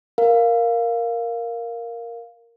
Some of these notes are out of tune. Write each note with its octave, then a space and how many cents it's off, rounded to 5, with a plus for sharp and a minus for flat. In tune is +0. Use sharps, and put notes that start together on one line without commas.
A#4 +0 F5 +0